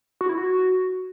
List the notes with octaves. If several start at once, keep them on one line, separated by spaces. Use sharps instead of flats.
F#4
E4
F#4